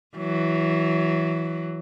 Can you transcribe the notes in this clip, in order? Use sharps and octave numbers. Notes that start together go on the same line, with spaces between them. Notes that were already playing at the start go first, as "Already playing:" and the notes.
E3 F#3